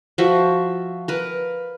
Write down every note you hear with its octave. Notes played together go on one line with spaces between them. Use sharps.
F3 F#4 E5
A#4 B4